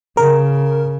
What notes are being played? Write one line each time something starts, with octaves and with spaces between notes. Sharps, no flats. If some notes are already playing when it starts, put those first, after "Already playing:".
C#3 A#4